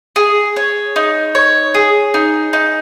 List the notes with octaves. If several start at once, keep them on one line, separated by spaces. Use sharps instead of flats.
G#4
C#5
D#4
C#5
G#4
D#4
D#4